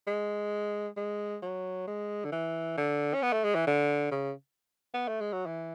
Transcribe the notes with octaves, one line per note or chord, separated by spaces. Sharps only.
G#3
G#3
F#3
G#3
D3
E3
D3
C#4
B3
A3
G#3
E3
D3
C#3
B3
A3
G#3
F#3
E3